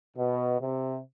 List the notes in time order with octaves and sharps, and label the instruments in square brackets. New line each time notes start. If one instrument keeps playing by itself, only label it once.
[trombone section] B2
C3